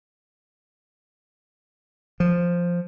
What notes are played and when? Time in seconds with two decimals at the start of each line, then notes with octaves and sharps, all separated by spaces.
2.20 F3